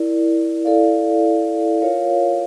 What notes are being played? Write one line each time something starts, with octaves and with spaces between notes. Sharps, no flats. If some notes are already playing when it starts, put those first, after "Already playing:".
Already playing: E4 A#4 D5
E4 A4 D5 F5
F4 A#4 C#5 F5